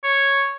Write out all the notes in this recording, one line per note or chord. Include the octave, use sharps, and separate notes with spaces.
C#5